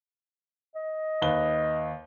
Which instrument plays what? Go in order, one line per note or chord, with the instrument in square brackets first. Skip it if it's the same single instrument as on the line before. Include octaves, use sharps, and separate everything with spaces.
[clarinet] D#5
[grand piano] D#2 B4 G7